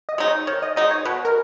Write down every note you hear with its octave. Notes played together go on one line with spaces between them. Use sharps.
D#5
G#3 D#4
C#5
D#3 C#5
D#5
G#3 D#4 D#5
C#5
B2 B4
A#4